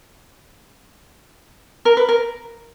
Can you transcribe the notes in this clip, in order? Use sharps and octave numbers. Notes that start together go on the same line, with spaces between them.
A#4
B4
A#4